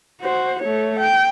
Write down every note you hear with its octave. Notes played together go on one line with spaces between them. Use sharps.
F#4 C5
A3 C#5
G5